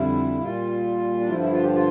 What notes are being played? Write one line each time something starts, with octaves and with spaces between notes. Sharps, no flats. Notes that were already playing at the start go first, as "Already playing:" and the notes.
Already playing: F2 D3 G3 E4
A#2 G3 F4
D4
G2 D3 F3 E4
E4
F4
G4
F4